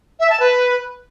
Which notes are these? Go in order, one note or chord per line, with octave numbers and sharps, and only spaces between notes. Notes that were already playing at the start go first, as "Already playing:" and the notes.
E5
A5
B4